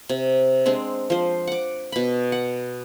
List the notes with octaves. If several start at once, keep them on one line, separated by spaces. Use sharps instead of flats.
C3
G#3 C4 D4
F3 C5
F#5 D6
B2 B5
F#5